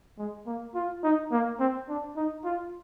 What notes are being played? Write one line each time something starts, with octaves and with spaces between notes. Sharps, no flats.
G#3
A#3
F4
D#4
A#3
C4
D4
D#4
F4